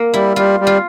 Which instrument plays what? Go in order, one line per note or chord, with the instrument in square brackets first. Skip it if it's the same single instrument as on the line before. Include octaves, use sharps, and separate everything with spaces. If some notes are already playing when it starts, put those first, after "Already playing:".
Already playing: [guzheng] A#3
[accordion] G3 [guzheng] E4
[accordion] G3 [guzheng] F4
[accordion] G3
[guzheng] F4